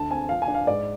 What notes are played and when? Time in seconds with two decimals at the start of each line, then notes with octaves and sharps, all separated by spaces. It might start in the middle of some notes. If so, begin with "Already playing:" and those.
Already playing: D2 D3 A5
0.10 C4 G#5
0.29 F3 F5
0.42 G#5
0.48 D4
0.54 F5
0.67 G#2 D5